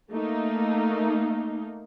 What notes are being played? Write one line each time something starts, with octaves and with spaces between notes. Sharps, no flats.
A3 A#3 D#4